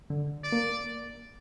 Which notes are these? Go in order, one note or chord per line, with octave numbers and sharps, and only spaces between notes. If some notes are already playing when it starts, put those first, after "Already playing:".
D3
D5
A#3